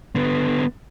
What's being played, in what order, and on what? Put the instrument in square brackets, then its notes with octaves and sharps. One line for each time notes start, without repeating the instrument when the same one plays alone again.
[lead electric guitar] D3 B3